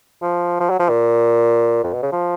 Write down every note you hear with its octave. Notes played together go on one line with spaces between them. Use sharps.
F3
F3
F#3
F3
A#2
F2
B2
C#3
F3